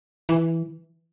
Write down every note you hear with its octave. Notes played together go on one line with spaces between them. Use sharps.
E3